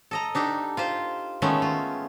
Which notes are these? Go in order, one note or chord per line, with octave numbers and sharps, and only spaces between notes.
A4 D#5 A#5
D4 D#4 G4 A4
F4 G4 C5
D#3 G#3 A3 B3 C#4
F4